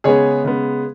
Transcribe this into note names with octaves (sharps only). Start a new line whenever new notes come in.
C#3 G#3 B3 G#4 C#5
C#3 G#3 B3